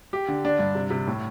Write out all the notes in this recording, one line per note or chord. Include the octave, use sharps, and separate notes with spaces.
G4
D3
D4
G2
C3
C3
A2